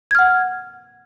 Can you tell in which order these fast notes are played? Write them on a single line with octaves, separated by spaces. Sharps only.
G#6 F6 F#5